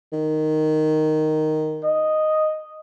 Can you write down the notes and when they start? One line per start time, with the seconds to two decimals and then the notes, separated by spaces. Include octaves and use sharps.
0.13 D#3
1.84 D#5